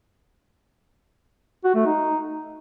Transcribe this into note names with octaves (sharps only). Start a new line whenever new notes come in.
F#4
A3
D#4